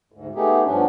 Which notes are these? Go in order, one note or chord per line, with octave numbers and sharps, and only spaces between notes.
D2 G#2
A3 B3 D#4 G4 G#4
G2 F3 B3 C#4 D4